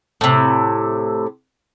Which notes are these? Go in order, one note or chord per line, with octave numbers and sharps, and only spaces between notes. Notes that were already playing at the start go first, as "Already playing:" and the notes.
A2 C3